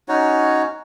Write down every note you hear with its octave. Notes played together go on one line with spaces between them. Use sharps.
C#4 D#4 F#4 C#5